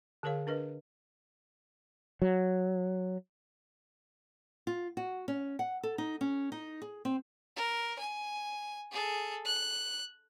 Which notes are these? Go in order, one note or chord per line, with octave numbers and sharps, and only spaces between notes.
D3 G#4 A#4 C#5 F5
D4 A#4 B4 D#5
F#3
F4
F#4
C#4
F#5
A4
D#4
C#4
D#4
G#4
C4
A#4
G#5
G#4 A4
F#6